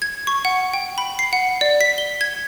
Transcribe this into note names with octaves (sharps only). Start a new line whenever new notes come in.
G#6
C#6
F#5
G5
B5
C7
F#5
D5
B6
G7
G#6